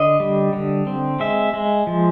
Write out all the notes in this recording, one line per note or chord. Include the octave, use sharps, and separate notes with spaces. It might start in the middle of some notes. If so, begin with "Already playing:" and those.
Already playing: D3 D#5
G3
D3
C4
G#3 E5
G#3
F3